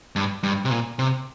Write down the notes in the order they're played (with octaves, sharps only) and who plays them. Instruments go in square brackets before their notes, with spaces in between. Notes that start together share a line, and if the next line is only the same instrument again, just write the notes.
[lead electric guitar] G2
G2
C3
A#2
C3